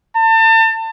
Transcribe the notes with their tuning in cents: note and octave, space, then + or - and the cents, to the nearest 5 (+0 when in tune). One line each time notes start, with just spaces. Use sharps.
A5 +35